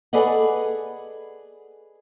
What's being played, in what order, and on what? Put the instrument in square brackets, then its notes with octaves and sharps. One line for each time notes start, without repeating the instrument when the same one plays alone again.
[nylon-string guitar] G#4 A4 B4 D5 D#5 F#5